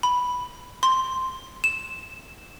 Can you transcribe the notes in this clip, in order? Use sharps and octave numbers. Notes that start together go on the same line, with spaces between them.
B5
C6
E7